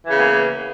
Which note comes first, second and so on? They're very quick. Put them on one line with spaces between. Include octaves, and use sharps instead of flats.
E3 C#3 B3 A#3